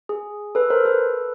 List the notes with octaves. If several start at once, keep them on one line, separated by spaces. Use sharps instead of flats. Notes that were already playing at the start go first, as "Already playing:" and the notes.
G#4
A4 B4
A#4 C5
A4 B4